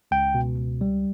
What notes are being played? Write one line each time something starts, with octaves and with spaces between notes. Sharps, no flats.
C#2 G5
B2
C#2
G3